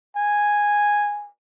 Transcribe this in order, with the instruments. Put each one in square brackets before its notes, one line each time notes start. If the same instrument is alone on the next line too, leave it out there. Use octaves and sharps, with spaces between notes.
[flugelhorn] G#5